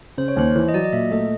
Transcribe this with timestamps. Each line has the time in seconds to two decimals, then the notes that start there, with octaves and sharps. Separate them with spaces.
0.18 C#3 C5
0.28 C#5
0.36 D#2 C5
0.56 E3
0.68 D#5
0.74 F#3 D5
0.84 D#5
0.93 A#2 E5
1.11 A3 D#5